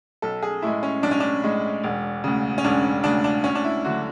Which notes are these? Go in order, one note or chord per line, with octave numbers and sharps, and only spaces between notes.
B1 A4
G#4
A2 G#3 E4
C#4
B1 D4
C#4
D4
A2 G#3
E1
D2 C#3
C#4
E1 D4
D2 C#3 D4
D4
D2 C#4
D4
E4
D3 F#3 A3 F#4